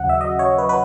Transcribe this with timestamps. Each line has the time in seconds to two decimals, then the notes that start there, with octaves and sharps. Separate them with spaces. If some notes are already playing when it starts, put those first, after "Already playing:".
Already playing: D#2 C#3 F#3 F#5
0.09 E5
0.21 D#5
0.39 C#5
0.58 B4
0.69 B4